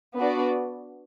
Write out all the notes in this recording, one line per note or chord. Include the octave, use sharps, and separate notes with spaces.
B3 D4 F#4 B4 D5